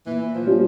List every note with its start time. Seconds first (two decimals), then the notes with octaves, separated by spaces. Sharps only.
0.06 A#2 E3
0.34 F3
0.47 G3 A#3 C#4 F4